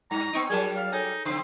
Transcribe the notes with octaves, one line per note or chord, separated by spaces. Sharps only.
G2 A#5
B3 C4 D#4 C#6 D7 D#7
F#3 G3 G#4 A#4 G#5 A5
F5
D#4 A4 C#5 G#5
C#3 C4 C5 C7